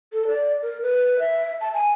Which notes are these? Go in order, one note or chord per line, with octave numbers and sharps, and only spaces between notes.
A4
D5
A#4
B4
E5
A5
G#5